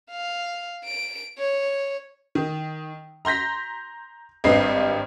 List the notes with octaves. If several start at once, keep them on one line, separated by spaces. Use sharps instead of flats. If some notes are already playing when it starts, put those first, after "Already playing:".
F5
D7
C#5
D#3
A#5 C6 G6 A#6 B6
G#1 G2 C4 B4 D#5 C7